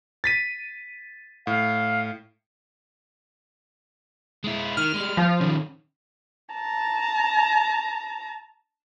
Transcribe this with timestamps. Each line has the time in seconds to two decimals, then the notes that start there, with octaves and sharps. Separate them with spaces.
0.24 A6 B6 D#7
1.47 A2 F5
4.44 G#3 E4
4.77 D#3 F6
4.94 G3 G#3
5.17 F3 F4
5.41 D#3 C#4
6.55 A5 A#5